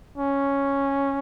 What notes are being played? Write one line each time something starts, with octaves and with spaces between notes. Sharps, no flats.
C#4